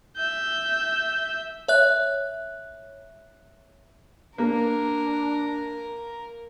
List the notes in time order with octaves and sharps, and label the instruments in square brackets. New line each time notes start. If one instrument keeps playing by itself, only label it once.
[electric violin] E5 G6
[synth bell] C#5 E5 F#6
[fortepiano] A#3 [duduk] D4 [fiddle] A#4